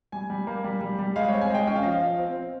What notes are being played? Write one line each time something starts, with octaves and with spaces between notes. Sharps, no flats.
G3 G#5
G3
A#3
G3
G3
G3
G#3 F5
C4 C#5
G#5
G#3 G5
C#4 G5
F5
F3 D#5
F5
F3
C4
C4